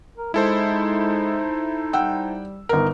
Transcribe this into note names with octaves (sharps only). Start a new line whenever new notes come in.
A#4
G#3 D#4 E4 A4 C5
G3 F#5 G5 E6
G1 D#4 A#4